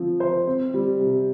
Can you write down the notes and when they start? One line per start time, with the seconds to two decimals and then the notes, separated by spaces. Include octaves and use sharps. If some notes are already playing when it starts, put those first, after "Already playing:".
Already playing: F3 C4
0.20 C5
0.47 C4
0.74 G3
0.99 C3